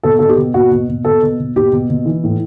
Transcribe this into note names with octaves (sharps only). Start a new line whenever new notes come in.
B2 A4
B2 A4
G4
B2
B2 F#4
B2
B2
B2 A4
B2
B2
B2 G4
B2
B2
E3
A2